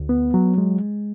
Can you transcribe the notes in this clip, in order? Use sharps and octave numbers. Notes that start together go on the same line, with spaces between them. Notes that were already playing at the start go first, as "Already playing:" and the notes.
Already playing: D2
B3
F#3
G#3